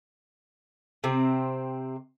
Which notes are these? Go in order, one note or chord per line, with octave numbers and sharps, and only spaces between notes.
C3 C4